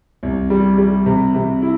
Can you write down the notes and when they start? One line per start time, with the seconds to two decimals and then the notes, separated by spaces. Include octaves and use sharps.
0.23 C2
0.50 G3
0.78 G3
1.06 C3
1.34 C3
1.62 E4